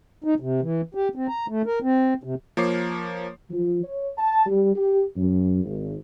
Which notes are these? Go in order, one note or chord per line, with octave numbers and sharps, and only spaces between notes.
D#4
C3
E3
G4
C4
A#5
A3
A#4
C4
C3
F3 A#3 C#5 D6 C7
F3
C#5
A5
G3
G4
F#2
G#1